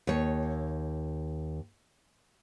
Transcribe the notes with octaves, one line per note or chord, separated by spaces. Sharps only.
D#2 C#5